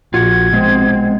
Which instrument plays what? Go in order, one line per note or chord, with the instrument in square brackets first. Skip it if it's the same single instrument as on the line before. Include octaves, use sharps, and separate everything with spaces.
[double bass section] A#1 [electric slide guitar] F4 F#4 [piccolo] G#6
[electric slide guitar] B2 G#3 [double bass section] C4